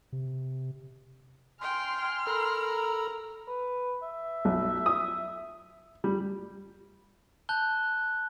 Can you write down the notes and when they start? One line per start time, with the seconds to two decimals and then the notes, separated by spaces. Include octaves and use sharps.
0.12 C3
1.62 G5 G#5 C6 F6
2.26 A4 A#4 A#5 B5 E6
3.48 B4
4.03 E5
4.45 B1
4.86 D#6
6.04 G3
7.49 A5 F#6 G6 G7